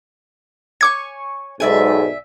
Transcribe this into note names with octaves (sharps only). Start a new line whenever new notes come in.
C#5 G#5 C#6 D6 G#6
B1 G#2 D5 E5 G#5